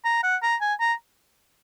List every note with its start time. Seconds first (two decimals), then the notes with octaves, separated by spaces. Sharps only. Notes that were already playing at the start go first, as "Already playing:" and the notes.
0.05 A#5
0.23 F#5
0.43 A#5
0.61 G#5
0.80 A#5